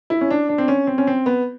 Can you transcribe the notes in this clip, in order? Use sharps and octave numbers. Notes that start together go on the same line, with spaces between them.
E4
C#4
D4
D4
C4
C#4
C4
C#4
C4
B3